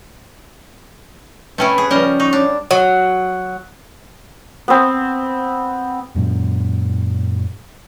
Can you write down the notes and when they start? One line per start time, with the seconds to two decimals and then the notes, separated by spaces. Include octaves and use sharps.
1.58 C3 A3 C#4 E4 B4 G5
1.78 G#4
1.91 C#3 F3 G3 C#4 A#4 D#5
2.20 D#4 C#6
2.33 D4 C#5
2.71 F#3
4.68 B3 C4
6.15 F#2 A#2